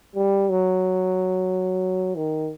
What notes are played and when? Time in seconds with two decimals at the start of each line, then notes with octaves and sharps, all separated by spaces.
0.16 G3
0.50 F#3
2.16 D#3